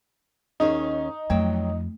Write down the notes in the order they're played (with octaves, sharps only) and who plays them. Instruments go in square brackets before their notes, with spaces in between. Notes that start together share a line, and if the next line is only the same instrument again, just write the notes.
[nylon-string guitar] D#2 C#4 G#4 [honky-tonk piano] D#4
[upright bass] F2 [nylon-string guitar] F#3 G5 [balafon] A3